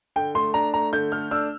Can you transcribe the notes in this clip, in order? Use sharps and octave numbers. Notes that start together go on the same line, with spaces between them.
D3 G5
A3 C6
D4 A#5
A3 A#5
D3 G6
A3 F6
D4 E6